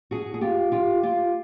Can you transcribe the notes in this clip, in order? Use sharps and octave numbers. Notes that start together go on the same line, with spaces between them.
F#4 G#4
G#4
F4 G4
F4 G4
F4 G4